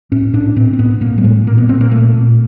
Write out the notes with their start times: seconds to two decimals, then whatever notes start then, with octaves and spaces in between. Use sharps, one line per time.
0.12 A2 C#4
0.33 A2 D4
0.56 A2 C4
0.73 C4
0.79 A2 B3
1.01 A2 A#3
1.18 G3
1.24 A2 G#3
1.47 A#2 A#3
1.58 B3
1.69 A#2 C4
1.81 A#3
1.91 A#2 A3
2.14 A#2